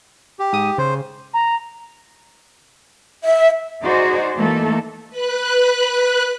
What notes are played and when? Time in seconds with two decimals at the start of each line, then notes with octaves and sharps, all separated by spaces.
0.39 G4
0.53 G#2 D#6
0.78 C#3 C5
1.34 A#5
3.23 E5
3.83 D#4 F#4 G#4 C5 D5
4.36 E3 A3 A#3 D#4 A4
5.10 B4 F#6